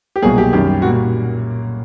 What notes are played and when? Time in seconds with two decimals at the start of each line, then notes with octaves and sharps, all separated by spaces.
0.16 G4
0.22 C2 B2 F#3 A#3 G#4
0.38 G4
0.53 F#2 D#3 G3 G4
0.82 A#2 G3 A#3 F#4